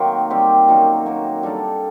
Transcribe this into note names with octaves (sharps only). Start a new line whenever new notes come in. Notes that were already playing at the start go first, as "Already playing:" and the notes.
Already playing: D#3 F#3 A#3 C4
G3 C4 G4
F#2 F#3 A#3 D#4
F#3 A#3 F#4 A#4
G3 D4 A4 D5